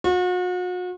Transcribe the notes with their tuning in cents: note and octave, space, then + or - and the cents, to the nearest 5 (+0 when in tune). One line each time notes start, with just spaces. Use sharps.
F#4 -40